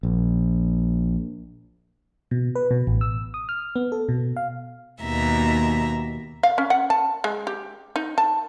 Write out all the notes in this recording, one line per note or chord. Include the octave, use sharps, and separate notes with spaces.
A#1
B2
B4
B2
A1
E6
D#6
F6
B3
A4
B2
F5
D#2 B2 E5 A#5
F5
C#4
F#5
A5
G#3
G4
D#4
A5